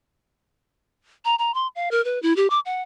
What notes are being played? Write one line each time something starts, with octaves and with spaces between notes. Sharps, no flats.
A#5
A#5
C6
F5
A#4
B4
E4
G4
D6
F#5